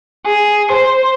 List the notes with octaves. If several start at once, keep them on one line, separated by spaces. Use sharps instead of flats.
G#4
C5